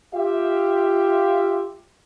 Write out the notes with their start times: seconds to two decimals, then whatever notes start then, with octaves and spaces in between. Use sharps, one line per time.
0.14 F4 G4 E5